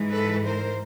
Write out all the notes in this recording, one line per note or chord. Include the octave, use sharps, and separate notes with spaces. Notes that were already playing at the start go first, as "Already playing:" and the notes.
Already playing: G#2 E3 G#3
A4 B4
A#4 C5